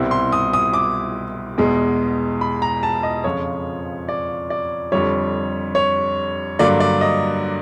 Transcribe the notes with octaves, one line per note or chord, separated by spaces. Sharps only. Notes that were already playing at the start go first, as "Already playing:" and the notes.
Already playing: C2 B2 G3 C4 E4
C6
D#6
D#6
D6
E2 B2 G#3
B5
A#5
A5
D#5
F2 C#3 F3 C#5
D5
D5
F2 D3 G3 C#5
C#5
G2 D3 F#3 A#3 D5
D5
D#5